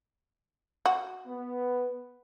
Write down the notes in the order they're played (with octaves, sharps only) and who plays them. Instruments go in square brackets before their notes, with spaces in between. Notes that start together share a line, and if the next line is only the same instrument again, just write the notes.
[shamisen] F#4
[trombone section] B3